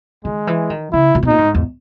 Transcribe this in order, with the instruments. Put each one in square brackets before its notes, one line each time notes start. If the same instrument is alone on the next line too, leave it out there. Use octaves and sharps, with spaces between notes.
[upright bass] D#3 [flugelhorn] G#3
[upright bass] E3
D#3
[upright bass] C#3 [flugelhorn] E4
[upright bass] A#2
B2
[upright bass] A#2 [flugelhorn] D#4
[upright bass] G#2
E2